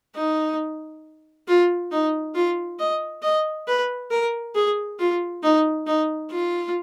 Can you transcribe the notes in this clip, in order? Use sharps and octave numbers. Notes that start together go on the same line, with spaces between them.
D#4
F4
D#4
F4
D#5
D#5
B4
A#4
G#4
F4
D#4
D#4
F4